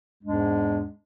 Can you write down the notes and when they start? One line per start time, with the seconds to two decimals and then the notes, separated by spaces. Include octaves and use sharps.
0.23 E2 G#2 G#3 D4